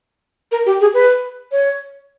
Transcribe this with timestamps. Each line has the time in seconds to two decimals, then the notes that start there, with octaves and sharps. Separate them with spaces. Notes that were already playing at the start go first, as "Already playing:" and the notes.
0.52 A#4
0.66 G4
0.81 G#4
0.94 B4
1.52 C#5